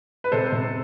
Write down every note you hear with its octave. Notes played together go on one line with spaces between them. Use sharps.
B4
C3 A4 C5
C3